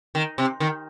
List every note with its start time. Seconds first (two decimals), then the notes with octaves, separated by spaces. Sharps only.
0.15 D#3
0.38 C3
0.60 D#3